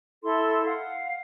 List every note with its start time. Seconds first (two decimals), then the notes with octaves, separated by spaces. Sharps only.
0.22 E4 A4 C6
0.64 F5 F#5